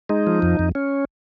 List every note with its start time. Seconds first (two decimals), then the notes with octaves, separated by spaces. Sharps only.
0.09 G#3 D#4
0.27 F3
0.42 F2
0.59 F2
0.75 C#4